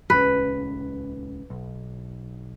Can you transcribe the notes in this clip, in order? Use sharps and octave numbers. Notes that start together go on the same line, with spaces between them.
D#1 C#2 C#3 B4
B1